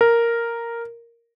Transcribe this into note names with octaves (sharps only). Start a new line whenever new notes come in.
A#4